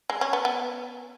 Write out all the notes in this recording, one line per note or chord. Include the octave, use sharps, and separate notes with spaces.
G#3
C#4
B3
B3